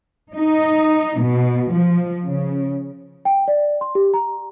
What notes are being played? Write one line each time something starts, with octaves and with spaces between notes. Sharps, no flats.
D#4
B2
F3
C#3
G5
D5
C6
G4
A#5